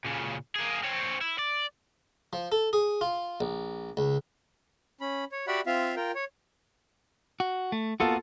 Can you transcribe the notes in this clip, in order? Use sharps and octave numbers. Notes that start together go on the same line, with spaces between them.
A#2 C#3
A#3 G#4
C4 C#5
E4
D5
F3
A4
G#4
F4
A#1
C#2
C#4 B5
C#5
F#4 G4 D5 E5 F#5 B5
C4 F4 E5 F5
F4 A#4 G5
C#5
F#4
A3
A#3 B3 F4 F#4 A4